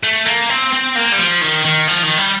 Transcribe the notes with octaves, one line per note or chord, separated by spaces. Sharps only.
A3
A#3
C4
C4
A#3
G3
F3
D#3
D#3
F3
D#3
G3